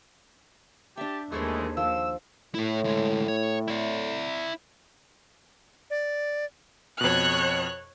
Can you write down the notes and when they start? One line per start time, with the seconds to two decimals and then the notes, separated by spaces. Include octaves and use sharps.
0.97 D4 G4 E5 A5
1.32 D#2 E3 G#3 A3 G#4 A4 C5
1.77 F3 E6
2.55 A2 E4 A4
2.84 D2 G#3
3.28 C#5
3.68 E4 D5
5.90 D5
7.01 F2 B2 C#5 F#6